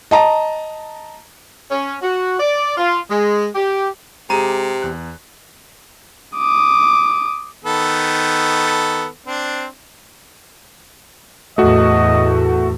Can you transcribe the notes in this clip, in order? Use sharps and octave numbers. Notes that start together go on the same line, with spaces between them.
D#5 A5 A#5
C#4
F#4
D5
F4
G#3
G4
C3 G#3 G4 G#4 A#5
E2 F#6
D6 D#6
D#3 B3 A4
C4 D4
E2 A2 A3 F#4 D#5